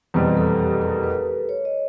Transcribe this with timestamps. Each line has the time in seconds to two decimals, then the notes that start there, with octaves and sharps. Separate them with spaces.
0.14 F1 E2 B2 G3 C4 B4
0.37 A4
0.59 G4
0.82 A#4
1.03 B4
1.49 C#5
1.65 D#5